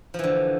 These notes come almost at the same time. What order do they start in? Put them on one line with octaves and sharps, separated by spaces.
F3 E3 D3